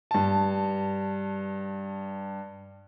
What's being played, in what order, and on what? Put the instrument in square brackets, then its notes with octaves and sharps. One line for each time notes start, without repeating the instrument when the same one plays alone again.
[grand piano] G2 A5